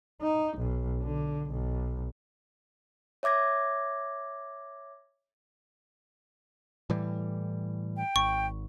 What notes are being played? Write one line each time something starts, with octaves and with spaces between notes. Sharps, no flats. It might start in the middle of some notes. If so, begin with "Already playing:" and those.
D#4
B1
D3
B1
C#5 E5 D6 G#6 A#6
A2 E3 G3
G5
G#1 C#6